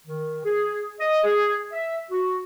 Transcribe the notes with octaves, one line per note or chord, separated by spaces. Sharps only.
D#3
G#4
D#5
G#4
E5
F#4